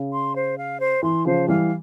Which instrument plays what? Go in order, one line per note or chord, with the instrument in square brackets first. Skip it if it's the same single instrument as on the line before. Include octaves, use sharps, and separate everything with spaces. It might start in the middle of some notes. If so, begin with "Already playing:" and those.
Already playing: [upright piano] C#3
[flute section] C6
C5
F5
C5
[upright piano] E3 [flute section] C6
[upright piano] C#3 F3 [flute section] C5
[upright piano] E3 G3 [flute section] F5